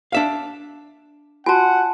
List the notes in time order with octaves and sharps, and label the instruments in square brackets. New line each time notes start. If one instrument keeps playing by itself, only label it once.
[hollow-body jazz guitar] D4 E5 F5
[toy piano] F4 F#4 [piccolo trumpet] F#5 [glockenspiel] G#5 A5